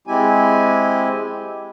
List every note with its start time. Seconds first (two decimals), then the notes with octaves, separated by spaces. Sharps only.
0.07 G#3 C4 E4 G4 G#5